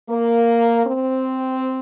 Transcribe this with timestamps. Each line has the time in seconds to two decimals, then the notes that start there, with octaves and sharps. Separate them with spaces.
0.10 A#3
0.86 C4